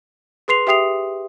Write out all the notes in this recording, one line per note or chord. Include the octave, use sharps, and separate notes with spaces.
G#4 B4 C6 C7 F7
G4 E5 G5 D#6 C7 F7